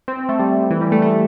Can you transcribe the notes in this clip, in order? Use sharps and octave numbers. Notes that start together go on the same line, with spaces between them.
C4
A3
G3
E3
G3
A3
A3